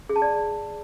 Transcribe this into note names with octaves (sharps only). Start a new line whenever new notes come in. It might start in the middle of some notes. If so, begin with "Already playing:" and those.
G#4
A5
D5